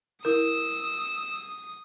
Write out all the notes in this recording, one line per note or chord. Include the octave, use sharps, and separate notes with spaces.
E4 A#4 D#6 E6